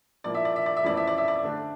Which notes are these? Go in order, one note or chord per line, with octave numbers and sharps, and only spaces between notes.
A#2 F3 A#3 E4 D5
E5
D5
E5
D5
E5
F2 E3 A3 C#4 E4 D5
E5
D5
E5
D5
D3 A3 D4